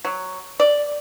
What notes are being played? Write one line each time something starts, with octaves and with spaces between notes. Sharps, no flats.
F#3
D5